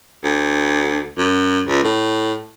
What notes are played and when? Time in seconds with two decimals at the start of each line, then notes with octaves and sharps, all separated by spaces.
0.24 D2
1.17 F#2
1.67 C#2
1.84 A2